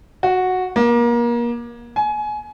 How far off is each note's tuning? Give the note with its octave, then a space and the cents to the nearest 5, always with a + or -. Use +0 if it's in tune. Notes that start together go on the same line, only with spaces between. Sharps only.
F#4 -5
A#3 +30
G#5 +25